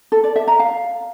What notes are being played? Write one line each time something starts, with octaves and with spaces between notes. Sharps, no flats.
A4
D5
E5
A#5
F5